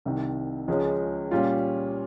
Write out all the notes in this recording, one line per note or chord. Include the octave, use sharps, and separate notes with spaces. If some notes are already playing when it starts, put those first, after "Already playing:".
C2 C3 D#3
C#2 C#3 F3 G#3 C#4
A#2 G3 C#4 F4